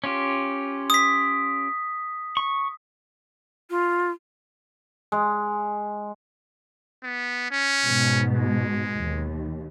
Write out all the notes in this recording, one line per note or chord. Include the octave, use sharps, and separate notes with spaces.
C#4 F4 G4
D#6 B6
C#6
F4
G#3
B3
C#4
G#2 B2
G#3
D#2